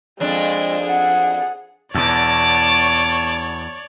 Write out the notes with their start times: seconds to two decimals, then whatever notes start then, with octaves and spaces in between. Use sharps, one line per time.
0.20 F2 G#3 D4
0.84 G#4 F#5
1.94 E2 B2 C#5 D5 A5 D6